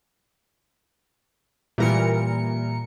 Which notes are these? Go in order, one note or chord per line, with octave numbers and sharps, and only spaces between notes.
A#2 E3 G3 E4 A#4 C#7